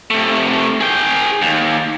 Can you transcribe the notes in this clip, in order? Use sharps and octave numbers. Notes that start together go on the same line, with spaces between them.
C3 A3
G#4 G5
D#2